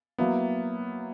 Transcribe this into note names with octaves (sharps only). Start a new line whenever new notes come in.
F#3 A#3 B3 E4